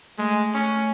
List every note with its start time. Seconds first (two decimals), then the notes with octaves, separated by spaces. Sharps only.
0.18 G#3 A3
0.54 C#4 C#6